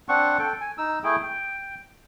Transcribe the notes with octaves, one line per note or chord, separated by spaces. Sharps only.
C4 D4 F#5 C#6
A4 G5
G#5
D#4 E6
A3 E4 G#4 G5
G5